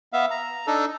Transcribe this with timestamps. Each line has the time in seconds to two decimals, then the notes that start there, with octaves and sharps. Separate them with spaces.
0.13 B3 E5 F5
0.31 A#5
0.67 D4 D#4 A4